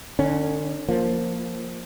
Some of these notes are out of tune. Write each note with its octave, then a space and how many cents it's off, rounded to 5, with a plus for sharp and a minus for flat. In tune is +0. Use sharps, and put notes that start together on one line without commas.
D3 +40 C#4 +0
F3 +0 A#3 +0